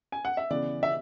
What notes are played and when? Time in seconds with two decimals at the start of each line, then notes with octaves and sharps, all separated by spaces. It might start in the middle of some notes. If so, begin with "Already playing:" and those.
0.12 G#5
0.25 F#5
0.37 E5
0.50 C#3 E3 B3 D5
0.83 E5